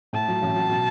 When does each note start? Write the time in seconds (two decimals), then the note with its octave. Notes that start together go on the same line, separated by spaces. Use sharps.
0.13 A2 A5
0.28 F#3
0.42 A1
0.56 F#3
0.70 B2